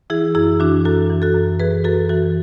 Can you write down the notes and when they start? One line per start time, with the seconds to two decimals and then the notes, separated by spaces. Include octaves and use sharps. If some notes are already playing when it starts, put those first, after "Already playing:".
0.10 E3 E4 G#4
0.35 F#2 E4 G#4
0.60 E3 D4 F#4
0.85 F#2 F#4 A4
1.10 E3
1.22 F#4 A4
1.35 F#2
1.60 E3 G#4 B4
1.84 F#2 F#4 A4
2.09 E3 F#4 A4